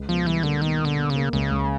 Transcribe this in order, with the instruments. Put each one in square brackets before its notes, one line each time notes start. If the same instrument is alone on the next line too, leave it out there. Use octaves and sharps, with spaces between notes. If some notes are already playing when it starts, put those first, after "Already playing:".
Already playing: [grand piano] C#2
[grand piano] B2 [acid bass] F3
[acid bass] E3 [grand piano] G3
[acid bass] D3 [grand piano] A#3
[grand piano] B2 [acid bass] D#3
[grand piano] B2
[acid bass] D3
[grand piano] B2
[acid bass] C#3
[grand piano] A#3
[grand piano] C#2 [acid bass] C#3
[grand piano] C#2